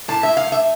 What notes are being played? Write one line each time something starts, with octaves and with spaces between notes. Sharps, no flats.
A2 A5
A2 E5
F5
A3
E5